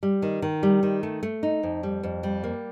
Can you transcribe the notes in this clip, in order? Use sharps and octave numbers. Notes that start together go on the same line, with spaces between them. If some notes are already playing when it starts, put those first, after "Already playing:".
G3
D#3
D#3
G3
D#3
A3
A3
D#4
F2
G3
F2
G3
A#3